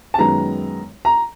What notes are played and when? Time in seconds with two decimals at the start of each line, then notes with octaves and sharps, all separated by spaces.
0.14 A5
0.18 F#2 D#3 G#3 B3 A#5
1.05 A#5